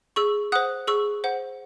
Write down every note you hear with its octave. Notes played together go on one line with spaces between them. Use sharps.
G#4 C#6 E6
C5 F#5 D#6 F#6
G#4 C#6 E6
C5 F#5